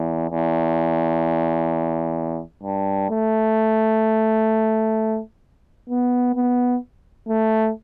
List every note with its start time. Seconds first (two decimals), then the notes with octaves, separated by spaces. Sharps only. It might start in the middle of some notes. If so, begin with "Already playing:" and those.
Already playing: E2
0.30 E2
2.63 G2
3.10 A3
5.89 B3
6.35 B3
7.28 A3